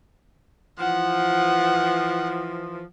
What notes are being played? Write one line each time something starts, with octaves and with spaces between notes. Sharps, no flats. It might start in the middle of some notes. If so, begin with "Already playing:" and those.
E3 F3 F#5